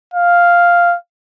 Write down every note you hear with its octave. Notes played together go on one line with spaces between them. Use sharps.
F5